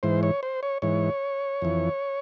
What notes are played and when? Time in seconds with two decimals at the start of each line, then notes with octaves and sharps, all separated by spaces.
0.03 G#2 E3 C5
0.23 C#5
0.43 C5
0.63 C#5
0.82 G#2 E3 C#5
1.62 F2 E3